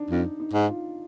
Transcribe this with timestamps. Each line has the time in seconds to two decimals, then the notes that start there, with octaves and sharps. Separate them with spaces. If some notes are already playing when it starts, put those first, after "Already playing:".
Already playing: D4 D#4
0.11 F2 D#4
0.40 D#4
0.54 G#2
0.68 F4